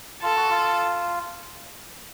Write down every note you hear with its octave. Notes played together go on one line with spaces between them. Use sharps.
F4 A4
F#4
F4